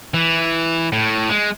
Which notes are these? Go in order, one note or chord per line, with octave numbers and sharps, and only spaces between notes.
E3
A2
G#3